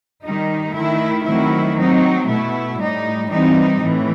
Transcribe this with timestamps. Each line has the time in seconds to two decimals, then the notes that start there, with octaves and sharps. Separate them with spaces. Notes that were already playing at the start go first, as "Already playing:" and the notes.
0.23 D#3 G3 D#4
0.74 D#3 A3 E4
1.25 D#3 F#3 A3 C4 E4
1.77 F#3 C4 D#4
2.28 B2 A3 E4
2.78 A2 G3 D#4
3.30 E3 G3 C4 D#4
3.82 A2 E3